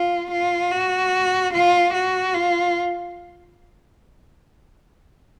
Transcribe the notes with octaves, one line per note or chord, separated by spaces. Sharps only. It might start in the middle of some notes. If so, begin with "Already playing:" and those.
Already playing: F4
F4
F#4
F4
F#4
F4